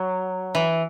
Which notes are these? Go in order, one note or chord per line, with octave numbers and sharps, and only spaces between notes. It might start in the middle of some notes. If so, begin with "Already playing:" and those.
Already playing: F#3
E3